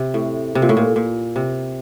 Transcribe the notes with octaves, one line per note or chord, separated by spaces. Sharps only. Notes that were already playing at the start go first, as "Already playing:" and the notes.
Already playing: C3
A2
C3
A#2
A2
A#2
A#2
C3